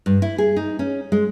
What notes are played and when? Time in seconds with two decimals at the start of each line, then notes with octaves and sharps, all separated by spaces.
0.06 G2
0.22 E4
0.38 G#4
0.56 D#4
0.79 C#4
1.12 G#3